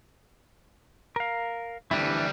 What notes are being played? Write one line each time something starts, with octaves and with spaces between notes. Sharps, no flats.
A#4 F5
D2 E3 G3 D4 E4